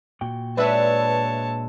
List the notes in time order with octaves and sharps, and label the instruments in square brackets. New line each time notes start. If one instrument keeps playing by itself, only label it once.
[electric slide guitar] A#2 F#4 G5
[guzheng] G#3 D4 [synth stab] B4 E5 [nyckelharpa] C#5 A5